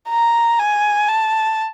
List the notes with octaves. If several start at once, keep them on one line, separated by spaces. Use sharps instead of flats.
A#5
G#5
A5